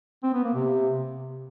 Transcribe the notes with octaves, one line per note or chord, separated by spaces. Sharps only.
C4
B3
A#3
C3